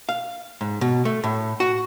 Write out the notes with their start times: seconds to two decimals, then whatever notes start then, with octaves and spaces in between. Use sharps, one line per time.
0.09 F5
0.61 G#2
0.81 B2
1.05 A3
1.24 A2
1.60 F#4